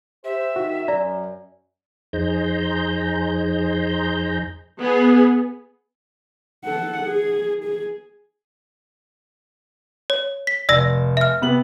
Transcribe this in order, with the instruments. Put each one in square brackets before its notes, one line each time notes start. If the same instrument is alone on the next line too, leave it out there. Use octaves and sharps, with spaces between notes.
[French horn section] G4 C5 [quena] E5
[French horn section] D#3 [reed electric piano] F#4
[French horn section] F#2 [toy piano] D5 [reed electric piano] A#5
[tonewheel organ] F2 D#4 G#4 C5 A#5 G6
[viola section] B3 G#4
[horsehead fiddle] A4 F#5
G#4
G#4
[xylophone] C#5
B6
[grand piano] F1 [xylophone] D5 E6 A#6
[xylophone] E5 F6
[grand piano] C3 B3 F#7